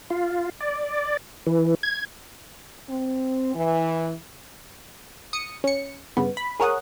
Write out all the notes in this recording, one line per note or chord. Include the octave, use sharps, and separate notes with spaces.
F4
D5
E3
G#6
C4
E3
D#6 C#7
C#4 C#7
G2 C#3 B3
B5
G#4 A#4 C#5 F#5 D#6